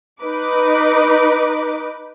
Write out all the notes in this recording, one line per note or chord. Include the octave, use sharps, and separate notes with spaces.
D#4 B4 D6